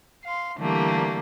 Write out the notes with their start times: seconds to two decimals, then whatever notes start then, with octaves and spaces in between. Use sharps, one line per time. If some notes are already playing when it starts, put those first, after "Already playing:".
0.25 F5 C6
0.57 D3 E3 G3 A3 A#3 G4